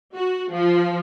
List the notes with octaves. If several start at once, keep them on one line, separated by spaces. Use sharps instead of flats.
F#4
F3